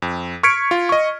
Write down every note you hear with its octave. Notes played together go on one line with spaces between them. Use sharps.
F2
C#6 F6 G#6 B6 C#7 D7
F4
D#5 C#6